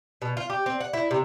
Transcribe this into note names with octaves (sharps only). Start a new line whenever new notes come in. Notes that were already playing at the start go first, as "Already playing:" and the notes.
B2
F4
G4
C4
F#5
E4
C3